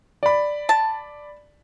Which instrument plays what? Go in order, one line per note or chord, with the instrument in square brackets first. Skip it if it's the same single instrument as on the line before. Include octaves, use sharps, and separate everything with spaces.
[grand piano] D5 B5
[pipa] A5